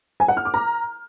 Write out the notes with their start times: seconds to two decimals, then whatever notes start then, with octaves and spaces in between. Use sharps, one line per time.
0.20 G#5
0.28 F#5
0.37 F6
0.45 D6
0.54 A#5